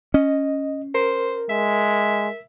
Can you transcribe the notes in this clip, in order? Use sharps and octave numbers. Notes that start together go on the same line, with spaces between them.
C#4 D#5
A#4 C5
G#3 E5